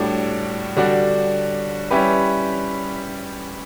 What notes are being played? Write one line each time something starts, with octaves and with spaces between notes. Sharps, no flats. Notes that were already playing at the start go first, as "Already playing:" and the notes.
Already playing: A2 G3 D4 F#4
D3 G3 D4 F#4
G3 C#4 E4 G4 B4